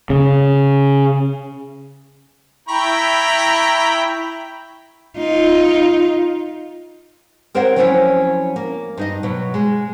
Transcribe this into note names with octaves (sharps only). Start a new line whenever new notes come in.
C#3
E4 G5 A#5 B5 C#6
D#4 F4
C4 A#4 C5 C#5 F#5
F3 F#3 C4 C#4 E4 C#5
A#3
G2 D#4 D#5
B2 F#3
G#3